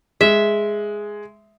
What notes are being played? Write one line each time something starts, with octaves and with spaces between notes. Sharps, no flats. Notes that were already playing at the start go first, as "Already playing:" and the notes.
G#3 E5